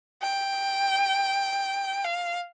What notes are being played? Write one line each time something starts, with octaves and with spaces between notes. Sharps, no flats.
G5
F5